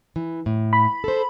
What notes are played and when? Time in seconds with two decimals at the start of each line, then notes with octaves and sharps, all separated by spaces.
0.16 E3
0.46 A2
0.73 B5
1.04 A4 C5